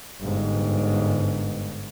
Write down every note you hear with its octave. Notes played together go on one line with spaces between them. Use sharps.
G1 G#2